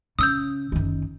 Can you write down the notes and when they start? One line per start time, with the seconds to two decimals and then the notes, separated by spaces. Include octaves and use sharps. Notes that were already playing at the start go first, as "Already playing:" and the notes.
0.19 C#3 D#6 E6 G6
0.72 F#1 D#3